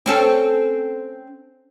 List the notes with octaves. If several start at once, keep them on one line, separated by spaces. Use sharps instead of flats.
C4 C#4 A4